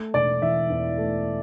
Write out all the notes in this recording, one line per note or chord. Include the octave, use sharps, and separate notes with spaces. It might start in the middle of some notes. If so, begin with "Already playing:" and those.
Already playing: A3
E1 D5
E3 E5
E2
A3